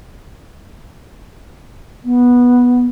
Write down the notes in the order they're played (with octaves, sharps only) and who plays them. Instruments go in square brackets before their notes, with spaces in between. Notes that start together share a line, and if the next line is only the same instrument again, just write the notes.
[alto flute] B3